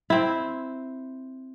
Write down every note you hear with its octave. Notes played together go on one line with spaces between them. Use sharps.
C4 E4